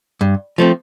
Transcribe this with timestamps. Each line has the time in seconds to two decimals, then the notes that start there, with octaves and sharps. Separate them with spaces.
0.21 G2
0.58 F3 A3 C4